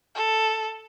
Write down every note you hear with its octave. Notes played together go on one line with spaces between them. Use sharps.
A4